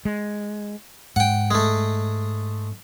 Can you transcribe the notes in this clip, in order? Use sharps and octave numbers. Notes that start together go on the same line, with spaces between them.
G#3
G#2 F#5 G5
G#3 A3